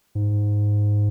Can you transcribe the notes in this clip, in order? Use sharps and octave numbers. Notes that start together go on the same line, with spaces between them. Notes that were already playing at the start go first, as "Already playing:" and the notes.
G#2